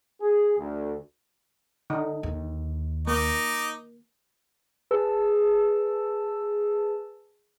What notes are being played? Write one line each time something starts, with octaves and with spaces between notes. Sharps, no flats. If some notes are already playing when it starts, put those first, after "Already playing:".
G#4
D2
D3 D#4
D#2
A#3 D#4 D6
G#4 B4 A5 E6